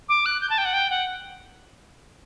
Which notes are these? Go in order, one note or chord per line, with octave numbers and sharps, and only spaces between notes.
D6
F#6
G6
A5
G5
F#5
G5
F#5